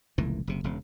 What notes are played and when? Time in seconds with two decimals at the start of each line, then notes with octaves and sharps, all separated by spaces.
0.18 F1 C#2 A#2 E3
0.47 F#1 C3
0.64 E1 C#3